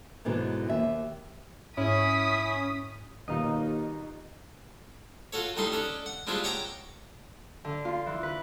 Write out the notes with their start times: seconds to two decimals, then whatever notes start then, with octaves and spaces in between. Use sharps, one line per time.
0.25 G#2 B2 D3 E3 F#3
0.69 D#2 E5
1.77 G#2 C#4 E4 D#6 B6
3.28 D#2 B2 G3 D#4 F4 D#5
5.33 F4 F#4 A4 C#5
5.56 A2 G3 D#4 A4 C6
5.72 C#4 D4 A4 D#5
6.06 F#5
6.27 G3 G#3 C4 D4 E4 F4
6.44 C#5 F#5 G5 A5 A#5 D6
7.65 D3
7.85 F4
8.06 E3
8.23 B4